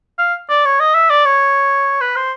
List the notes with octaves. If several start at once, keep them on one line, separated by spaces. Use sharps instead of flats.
F5
D5
C#5
D#5
E5
D5
C#5
B4
C5